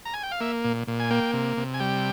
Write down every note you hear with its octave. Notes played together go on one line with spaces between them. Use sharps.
A#5
G#5
G5
F5
A#3 E5
A#2
A#2
G#5
A#3 G5
C3
C3
G#5
G3 G5